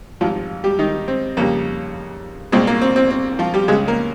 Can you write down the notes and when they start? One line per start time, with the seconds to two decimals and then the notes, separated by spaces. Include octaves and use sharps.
0.21 G#1 G#2 F3 G3 F4
0.64 G3 G4
0.79 D#3 D#4
1.08 C4
1.37 F2 C#3 G3 A#3
2.52 C2 A#2 G#3 C4
2.67 A#3
2.81 C4
2.96 C4
3.10 C4
3.39 F3 F4
3.54 G3 G4
3.68 C#2 C#3 G3 G#3 G#4
3.88 A#3 A#4